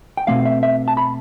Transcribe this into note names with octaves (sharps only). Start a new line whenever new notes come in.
G5
B2 A3 C4 F5
E5
E5
A5
B5